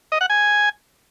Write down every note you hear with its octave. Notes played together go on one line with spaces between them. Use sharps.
D#5
F#5
G#5